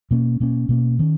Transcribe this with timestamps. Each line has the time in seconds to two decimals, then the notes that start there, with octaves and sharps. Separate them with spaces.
0.11 B2 A#3 C#4
0.40 B2 A#3 C#4
0.69 B2 A#3 C#4
0.99 D#3 A#3 C#4